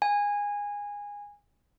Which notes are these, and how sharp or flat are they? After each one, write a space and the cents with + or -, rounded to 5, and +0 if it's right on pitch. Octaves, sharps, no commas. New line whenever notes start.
G#5 -20